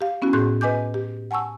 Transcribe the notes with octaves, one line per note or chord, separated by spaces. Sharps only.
G4 F5
B3 C#4 E4 F#4
A2 G#4 C6 F#6 G6
B4 D#5 G#5 D6 G6
G4
F#5 G#5 A5 C#6 E6